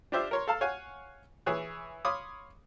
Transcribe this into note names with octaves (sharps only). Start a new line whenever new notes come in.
D4 F4 G4 C5 E5
A#4 C#5 C6
A4 F5 A5
C#5 F5 F#5 G#5
E3 G#4 C#5 F#6
C#5 F5 B5 C6 D6 D#6